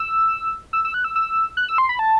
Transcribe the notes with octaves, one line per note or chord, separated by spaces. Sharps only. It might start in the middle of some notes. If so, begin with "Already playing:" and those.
Already playing: E6
E6
E6
F#6
E6
E6
F#6
E6
C6
B5
A5